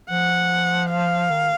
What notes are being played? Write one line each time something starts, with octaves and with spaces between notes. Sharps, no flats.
F3 F#5
F5
D#3